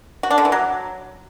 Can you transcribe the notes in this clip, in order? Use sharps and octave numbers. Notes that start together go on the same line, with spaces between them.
F#4
D4
D3
E3
F#3